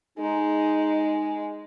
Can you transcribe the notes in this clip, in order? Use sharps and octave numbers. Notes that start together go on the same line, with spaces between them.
G#3 D#4